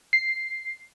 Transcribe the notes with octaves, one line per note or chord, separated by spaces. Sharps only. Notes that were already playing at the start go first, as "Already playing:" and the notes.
C7